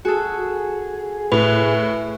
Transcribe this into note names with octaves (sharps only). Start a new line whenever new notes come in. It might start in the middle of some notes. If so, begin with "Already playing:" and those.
F#4 G#4 A4
A2 B4